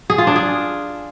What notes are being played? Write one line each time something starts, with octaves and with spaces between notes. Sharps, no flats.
G#4
F4
D4
G#4